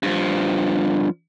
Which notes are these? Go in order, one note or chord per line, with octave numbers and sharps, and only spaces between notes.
G2 F3